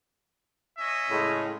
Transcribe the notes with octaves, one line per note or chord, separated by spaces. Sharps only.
C#4 D#5 E5
A2 C#3 G#3